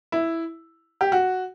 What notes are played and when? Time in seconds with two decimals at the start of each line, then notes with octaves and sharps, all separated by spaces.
0.12 E4
1.01 G4
1.12 F#4